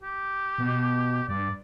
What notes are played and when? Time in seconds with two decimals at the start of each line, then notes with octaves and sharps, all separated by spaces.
0.02 G4
0.58 B2
1.29 G2 D5